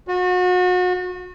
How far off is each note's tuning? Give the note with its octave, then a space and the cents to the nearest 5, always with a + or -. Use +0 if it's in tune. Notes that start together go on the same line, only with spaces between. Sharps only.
F#4 -35